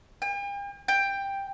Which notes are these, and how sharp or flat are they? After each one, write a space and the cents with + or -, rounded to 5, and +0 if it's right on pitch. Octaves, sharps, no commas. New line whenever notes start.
G5 +45
G5 +10